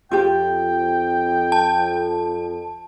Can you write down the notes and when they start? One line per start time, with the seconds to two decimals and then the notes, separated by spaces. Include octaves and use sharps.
0.11 F2 F4 G4 G5
1.52 A5